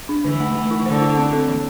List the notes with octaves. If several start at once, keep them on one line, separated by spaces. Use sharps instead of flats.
D4
D3 E3
A3
A3
E4
D3 C5
E4
C4
A4
E3